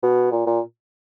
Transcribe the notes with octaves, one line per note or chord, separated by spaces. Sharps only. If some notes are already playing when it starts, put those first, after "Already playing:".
B2
A#2
A#2